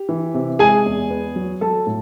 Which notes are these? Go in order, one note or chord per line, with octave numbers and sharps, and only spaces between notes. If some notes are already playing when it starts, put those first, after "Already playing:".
Already playing: G4
E3
C3
G#3 G#4 G#5
E2
B3
F#3
F#3 A4 A5
A2